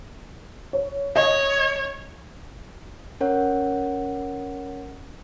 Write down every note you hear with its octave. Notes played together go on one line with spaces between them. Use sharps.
C#5
C#5 D#5
C#4 A#4 C#5 F#5